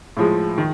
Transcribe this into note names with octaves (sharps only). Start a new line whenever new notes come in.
A2 F3 G#3
D#3